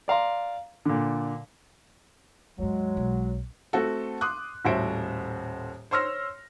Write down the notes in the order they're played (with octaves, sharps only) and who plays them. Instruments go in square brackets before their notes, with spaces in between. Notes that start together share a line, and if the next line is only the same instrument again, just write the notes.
[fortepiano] D5 F5 A#5 C6
A#2 D3
[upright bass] D#2 G#2 [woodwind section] F#3 G#3
[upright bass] B1
[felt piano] A3 C4 F#4 A4
C6 D6 D#6 F#6
D#1 A2 F#4 C5 E5 D7
C5 C#5 C6 E6 F6 A#6